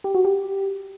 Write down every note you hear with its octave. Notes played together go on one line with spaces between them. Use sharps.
G4
F#4
G4